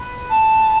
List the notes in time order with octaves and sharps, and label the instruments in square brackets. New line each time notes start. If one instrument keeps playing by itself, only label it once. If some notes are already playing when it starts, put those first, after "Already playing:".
Already playing: [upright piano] B4
[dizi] A5